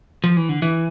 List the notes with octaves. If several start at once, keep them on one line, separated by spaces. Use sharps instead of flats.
F3
E3
D3
E3